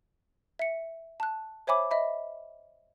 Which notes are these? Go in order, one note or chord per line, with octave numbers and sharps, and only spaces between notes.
E5 C#7
A5 F#6
C5 C#5 E5 G#5 B5 D6
D#5 E5 B5